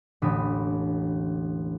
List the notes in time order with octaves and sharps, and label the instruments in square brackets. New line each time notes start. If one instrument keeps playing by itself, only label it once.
[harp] E1 A1 D3 B5 D#6